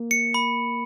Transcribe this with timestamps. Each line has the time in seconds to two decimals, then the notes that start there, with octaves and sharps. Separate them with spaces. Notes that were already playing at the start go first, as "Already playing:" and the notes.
Already playing: A#3
0.11 C#7
0.34 B5